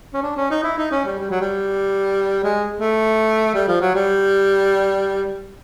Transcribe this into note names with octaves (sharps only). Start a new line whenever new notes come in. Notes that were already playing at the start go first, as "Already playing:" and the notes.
C#4
D4
C#4
D#4
E4
D#4
C#4
G3
G3
F#3
G3
G#3
A3
G3
F3
F#3
G3